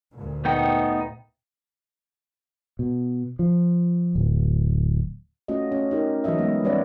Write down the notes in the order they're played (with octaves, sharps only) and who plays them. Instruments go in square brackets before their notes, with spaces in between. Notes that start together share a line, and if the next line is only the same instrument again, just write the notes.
[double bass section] D2 A#2
[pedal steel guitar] A3 B3 D#4 [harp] G5
[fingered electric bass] B2
F3
D1
[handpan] A3 C#4 F4 F#4 D#5
C#4
D#4 G4 A#4
E3 F#3 E4 D#5 E5
G#3 B3
G3 C#4 B4 C#5 D5 E5